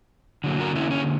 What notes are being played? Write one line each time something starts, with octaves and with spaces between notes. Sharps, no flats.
D3 F#3 A#3
F#4 A#4
C#4 E4
C#4